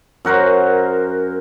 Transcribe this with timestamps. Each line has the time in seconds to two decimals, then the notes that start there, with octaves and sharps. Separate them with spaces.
0.25 F#2 F#4 A#4 C5